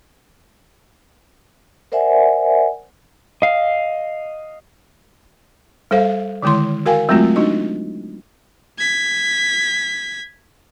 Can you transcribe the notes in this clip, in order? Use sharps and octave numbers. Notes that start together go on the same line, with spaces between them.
A#4 C5 D5 E5 F#5 G#5
D#5 F5
G3 A4 C5 F5
D3 D#3 G#3 E4 C6
F#4 A#4 F5 G5 G#5
F#3 G#3 A3 C4 F4 F#4
D4 D#4 F#4 D#5
G#6 B6